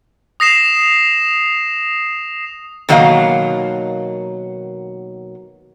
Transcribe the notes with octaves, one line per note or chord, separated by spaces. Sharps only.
D#6 A#6 C7 E7 F7
B2 D#3 F#3 A#3 D#5 F5